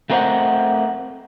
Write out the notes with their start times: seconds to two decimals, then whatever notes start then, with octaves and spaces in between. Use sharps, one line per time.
0.10 A3 C4 A#4 C5 D#5 F#5